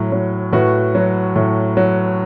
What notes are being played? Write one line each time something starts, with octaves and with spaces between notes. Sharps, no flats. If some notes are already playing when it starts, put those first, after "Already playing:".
Already playing: A2 F#3
F#3
A2 F#4 B4
F#3
A2
F#3